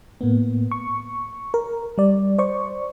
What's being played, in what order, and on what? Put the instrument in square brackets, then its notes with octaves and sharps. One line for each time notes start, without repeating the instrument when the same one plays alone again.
[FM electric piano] A2 A#3 B3
C#6
A#4
G3 D5
C5 D5 C#6